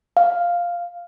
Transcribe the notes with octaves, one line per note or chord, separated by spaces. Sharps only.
F5